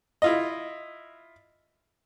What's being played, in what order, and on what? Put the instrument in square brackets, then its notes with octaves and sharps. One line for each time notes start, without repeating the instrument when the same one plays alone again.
[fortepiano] E4 F4 D#5